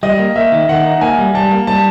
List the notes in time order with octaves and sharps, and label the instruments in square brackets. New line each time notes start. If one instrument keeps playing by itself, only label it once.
[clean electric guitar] G3 [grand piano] D#5
[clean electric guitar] A#3
[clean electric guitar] A#3 [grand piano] E5
[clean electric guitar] D#3
[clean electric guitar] D#3 [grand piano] F#5
[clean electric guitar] D#4
[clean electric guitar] A#3 [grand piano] G#5
[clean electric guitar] G3
[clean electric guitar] G3 [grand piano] A5
[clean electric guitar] A#3
[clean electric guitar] G3 [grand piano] A5